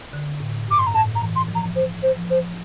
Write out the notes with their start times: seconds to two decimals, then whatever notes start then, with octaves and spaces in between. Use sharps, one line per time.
0.13 D3
0.40 A2
0.68 G2 D6
0.79 C6
0.87 A#5
0.95 A2 A5
1.15 A#5
1.22 E3
1.36 C6
1.48 F3
1.55 A#5
1.75 C5
2.02 C5
2.16 F3
2.30 C5